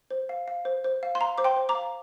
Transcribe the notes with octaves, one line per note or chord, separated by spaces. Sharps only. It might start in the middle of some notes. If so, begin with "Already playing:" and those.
C5
F5
F5
C5
C5
F5
C6
F5 A#5
C5 D6
G5 C6
C5
A#5 D6
F5